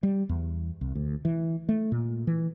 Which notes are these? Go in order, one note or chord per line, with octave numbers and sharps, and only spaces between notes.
G3
E2
C2
D2
E3
A3
A#2
E3